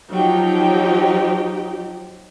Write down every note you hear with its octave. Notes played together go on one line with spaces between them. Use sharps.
F3 F#3 D#4 G4 G5